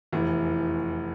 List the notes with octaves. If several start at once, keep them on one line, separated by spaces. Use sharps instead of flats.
F1 E2 E3